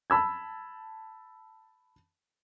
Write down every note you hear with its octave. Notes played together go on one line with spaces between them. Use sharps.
A5 B5 E6 G#6